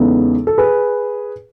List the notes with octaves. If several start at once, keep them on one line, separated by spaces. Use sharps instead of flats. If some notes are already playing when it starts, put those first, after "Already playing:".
Already playing: E2 C#3 G#3 B3 D#4 A4
A4
G#4 B4